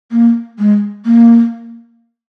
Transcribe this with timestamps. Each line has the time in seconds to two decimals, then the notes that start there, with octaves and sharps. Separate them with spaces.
0.12 A#3
0.59 G#3
1.06 A#3